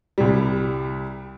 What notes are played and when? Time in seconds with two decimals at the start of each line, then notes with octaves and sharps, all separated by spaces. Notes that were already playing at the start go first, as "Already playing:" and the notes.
0.18 C2 G3